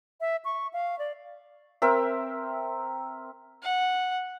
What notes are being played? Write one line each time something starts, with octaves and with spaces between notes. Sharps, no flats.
E5
C#6
F5
D5
C4 A#4 E5
F#5